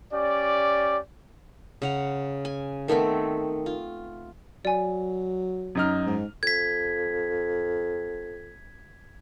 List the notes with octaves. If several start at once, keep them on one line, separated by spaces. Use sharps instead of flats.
C#4 G4 D5
C#3 F#5 A#5
G#5
D#3 A3 B3 C4
F4
F#3 D5 G#5
F#2 D#4 F6
G#2
F2 G#6 B6